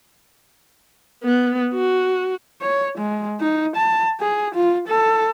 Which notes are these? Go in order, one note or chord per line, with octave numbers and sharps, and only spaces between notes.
B3
F#4
C#5
G#3
D#4
A5
G#4
F4
A4